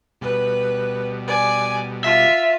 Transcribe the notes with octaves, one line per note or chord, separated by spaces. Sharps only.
B2 G3 B4
D5 G#5
F4 E5